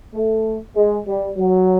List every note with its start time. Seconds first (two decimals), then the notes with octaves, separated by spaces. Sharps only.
0.14 A3
0.76 G#3
1.07 G3
1.38 F#3